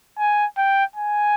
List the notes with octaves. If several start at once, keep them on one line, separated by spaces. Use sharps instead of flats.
G#5
G5
G#5